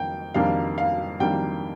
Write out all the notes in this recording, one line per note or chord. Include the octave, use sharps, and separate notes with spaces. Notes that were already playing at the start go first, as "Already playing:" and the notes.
Already playing: F2 D#3 A#3 G5
F2 D#3 G3 A#3 D4 F5
F5
F2 D#3 G3 A#3 D4 G5